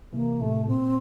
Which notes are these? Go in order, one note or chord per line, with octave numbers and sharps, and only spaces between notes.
C3 E3 A#3
A2 C3 A3
A#2 C4